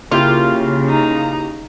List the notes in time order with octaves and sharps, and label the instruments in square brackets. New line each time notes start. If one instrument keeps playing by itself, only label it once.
[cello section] C#3 [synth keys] A#3 E4 G4 [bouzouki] F4
[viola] D#4 A#5